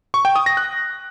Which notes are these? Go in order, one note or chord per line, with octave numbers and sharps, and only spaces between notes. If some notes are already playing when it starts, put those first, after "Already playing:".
C#6
G5
D#6
A#6
F#6